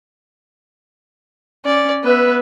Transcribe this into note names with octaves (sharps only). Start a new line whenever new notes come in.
C#4 D5
B3 B4 E5